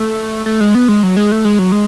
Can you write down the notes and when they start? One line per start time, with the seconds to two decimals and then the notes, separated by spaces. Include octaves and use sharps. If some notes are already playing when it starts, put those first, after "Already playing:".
Already playing: A3
0.46 A3
0.60 G#3
0.75 B3
0.88 G#3
1.03 F#3
1.17 G#3
1.32 A3
1.45 G#3
1.59 F#3
1.72 G#3